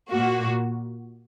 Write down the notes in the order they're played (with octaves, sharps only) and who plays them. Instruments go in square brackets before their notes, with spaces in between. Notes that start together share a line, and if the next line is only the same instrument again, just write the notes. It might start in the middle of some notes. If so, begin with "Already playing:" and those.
[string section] A#2 A#3 F#4